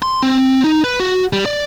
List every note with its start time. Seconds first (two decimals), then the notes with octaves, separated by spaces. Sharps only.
0.02 C6
0.23 C4
0.64 D#4
0.84 B4
1.00 F#4
1.33 G3
1.46 D5